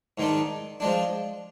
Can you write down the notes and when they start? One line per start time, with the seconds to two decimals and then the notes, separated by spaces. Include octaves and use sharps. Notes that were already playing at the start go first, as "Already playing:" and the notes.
0.18 G#2 D#3 G#3 D4
0.80 F3 G#3 D4